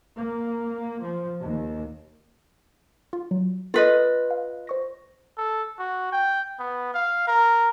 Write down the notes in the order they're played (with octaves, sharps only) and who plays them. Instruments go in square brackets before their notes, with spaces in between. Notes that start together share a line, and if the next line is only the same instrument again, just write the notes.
[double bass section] A#3
F3
D#2
[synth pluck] F4
F#3
[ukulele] F4 B4 D#5 [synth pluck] A4
[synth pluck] F5
C5 C#6 A#6
[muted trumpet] A4
F#4
G5
B3
F5
A#4